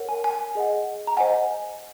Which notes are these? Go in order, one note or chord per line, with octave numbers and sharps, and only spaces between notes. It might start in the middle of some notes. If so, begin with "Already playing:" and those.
Already playing: A#4 C#5 F#5
G#5
G#5
G#4 D#5 F#5
A#5
C5 D#5 F#5 G#5